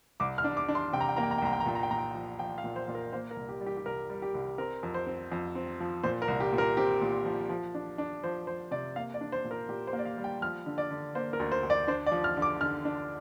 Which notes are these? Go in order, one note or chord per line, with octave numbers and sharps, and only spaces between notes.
C2 D6
F6
D4
D6
D4
C6
C3 G5
A#5
G5
A#3 A#5
G5
A#5
G5
C2 A#5
G5
A#5
A#2 G5
A#5
G5
A#2 A#5
G5
F3
F3 G5
F5
A#2
C5
A#2
A#4
A#3 C5
A#4
C2
G4
G3
G4
G4
C2 A#4
G3
G4
C2
C4 A#4
F2
C5
C4
F2
C4
F3
A#2 C5
A#4
C2
G4
A#2
A#4
C4 G4
A#2
F3
F3
D4
D4
F3 C5
F3 C5
C3 D5
A#3 F5
D5
D4
C5
A#2
A#4
A#2 G4
C5
A#3
D5
F5
G3
G5
F3 F6
D3
D5
D3
A#3 C5
A#4
D2
C5
D2
D5
D4 C5
D5
F3
F6
D3
D6
D3 F6
D4